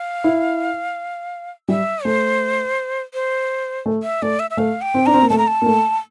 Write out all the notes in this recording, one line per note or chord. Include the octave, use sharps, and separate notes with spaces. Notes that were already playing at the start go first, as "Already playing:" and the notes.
Already playing: F5
E4
G3 E5
A3 C5
C5
A3
E5
A3 D5
E5
E5
A3 F5
G5
C4
D4 A#5
C4
A#3
A3 A5
A#5
A5
A#3
A3